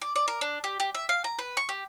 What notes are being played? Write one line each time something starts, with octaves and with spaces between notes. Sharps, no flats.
D5
D5
A#4
D4
G4
G4
E5
F5
A#5
B4
C#6
G4